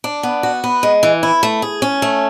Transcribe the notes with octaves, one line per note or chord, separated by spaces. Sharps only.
D4
B3
F#4
B3
G#3
E3
E4
A3
G#4
C#4
A3